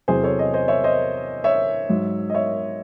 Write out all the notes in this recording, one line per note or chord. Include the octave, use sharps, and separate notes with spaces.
E2 C3 F#3 G#4 C5
A4 C#5
C5 D#5
C5 D#5
C#5 E5
C5 D#5
C#5 E5
G#2 F#3
D#5
C#5 E5